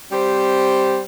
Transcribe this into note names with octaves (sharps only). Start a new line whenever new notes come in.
G3 C4 G4 C5